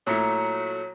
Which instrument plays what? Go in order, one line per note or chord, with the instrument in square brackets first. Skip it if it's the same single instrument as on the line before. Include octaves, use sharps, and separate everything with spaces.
[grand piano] A#2 A3 E4 [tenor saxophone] F#3 [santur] A#5